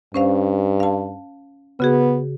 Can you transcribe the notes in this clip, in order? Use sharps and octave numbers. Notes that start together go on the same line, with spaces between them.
G2 C#4 C5 F5
F5 A5
C#3 B3 F#4 G#4